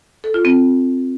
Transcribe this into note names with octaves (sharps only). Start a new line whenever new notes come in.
A4
F4
C4